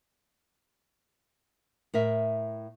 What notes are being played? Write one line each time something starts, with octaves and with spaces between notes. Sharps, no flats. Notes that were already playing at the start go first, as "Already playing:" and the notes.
A2 A#4 E5